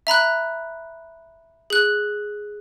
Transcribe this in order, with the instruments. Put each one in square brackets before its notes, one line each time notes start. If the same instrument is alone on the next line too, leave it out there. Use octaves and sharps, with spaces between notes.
[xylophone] E5 A#5 B5 F#6
G#4 F#6